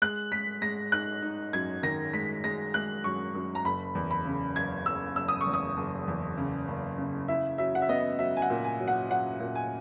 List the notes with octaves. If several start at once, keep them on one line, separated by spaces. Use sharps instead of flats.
G#3 F#6
G#3 B6
G#3 A#6
D#4 F#6
D#4
F#2 G#6
D#3 A#6
G#3 B6
G#3 A#6
G#3 F#6
F#2 C#6
F#2
A#5
F#1 B5
E2
B5
C#3
F#1 G#6
F#1 E6
F#1 E6
D#6
C#6
E2
D#6
F#1
E2
C#3
F#1
C#3
E4 E5
F#3 E5
F#5
E5
B3 D#5
F#3 E5
G#5
F#5
A#2
G#5
F#3
F#5
F#3 F#5
A#2
G#5